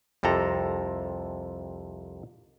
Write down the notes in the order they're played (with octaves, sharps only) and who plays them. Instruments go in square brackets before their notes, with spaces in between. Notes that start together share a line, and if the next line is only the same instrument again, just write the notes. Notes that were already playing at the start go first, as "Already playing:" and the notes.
[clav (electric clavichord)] C2 F2 C3 A4 A#5